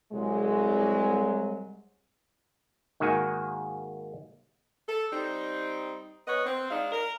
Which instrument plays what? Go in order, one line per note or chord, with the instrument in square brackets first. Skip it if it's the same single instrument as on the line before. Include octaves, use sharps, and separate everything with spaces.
[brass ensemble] C2 F#3 G#3
[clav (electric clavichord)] G#2 D#3 A#3 F#4 G#5
[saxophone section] A4
G3 C4 D#4
B3 C#5 D#5 F#5
C4
G#3 D4 D#4 F5
A#4